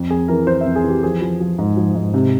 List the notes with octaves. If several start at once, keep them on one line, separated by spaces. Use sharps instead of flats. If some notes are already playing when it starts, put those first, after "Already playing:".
Already playing: F2
F2 G#4
E3 A#4
E3 C5
F2 E5
G#4
E3
G4
F3 G#4
F3
F3
G#2
F3
G#2
C3